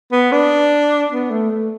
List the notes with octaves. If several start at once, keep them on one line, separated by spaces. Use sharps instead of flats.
B3
D4
B3
A3
A3